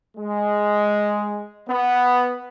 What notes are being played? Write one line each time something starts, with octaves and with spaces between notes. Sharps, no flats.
G#3
B3